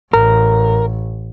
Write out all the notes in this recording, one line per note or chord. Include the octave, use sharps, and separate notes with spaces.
A1 A#4